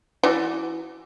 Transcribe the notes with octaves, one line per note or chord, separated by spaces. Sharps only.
E3 F#4 D5